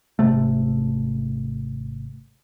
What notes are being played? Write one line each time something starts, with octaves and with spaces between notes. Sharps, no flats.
G#1 C3 A3